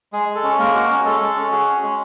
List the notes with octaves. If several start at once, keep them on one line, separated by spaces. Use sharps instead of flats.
G#3 G#4
G#3
A4
C#4
G#3 A#3 A#4
F#4
C#4
G#3 A4
G#3
C#4
F#4 G#4
C#4
G#3